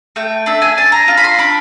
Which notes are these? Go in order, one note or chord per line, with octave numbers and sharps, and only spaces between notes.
A3 G5
D4 E5
G#5
D4 A5
A#5
F4
B5
C6
D4 B5